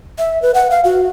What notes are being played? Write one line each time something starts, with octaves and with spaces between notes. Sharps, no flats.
E5
B4
F#5
F5
F#4